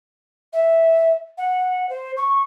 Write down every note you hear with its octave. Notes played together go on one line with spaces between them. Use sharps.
E5
F#5
C5
C#6